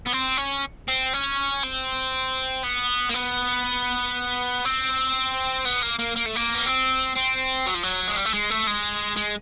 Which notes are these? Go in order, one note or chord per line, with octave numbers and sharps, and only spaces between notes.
B3
C4
C#4
C4
C#4
C4
B3
A#3
B3
C4
B3
A#3
A#3
A#3
A3
A#3
B3
C4
C4
F#3
F3
F#3
G#3
G3
A3
G#3
A3
G#3
G#3